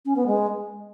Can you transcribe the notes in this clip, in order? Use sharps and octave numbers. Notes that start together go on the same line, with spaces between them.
C#4
B3
G#3